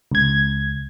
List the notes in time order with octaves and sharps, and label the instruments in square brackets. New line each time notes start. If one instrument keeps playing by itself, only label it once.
[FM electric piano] C#2 G#6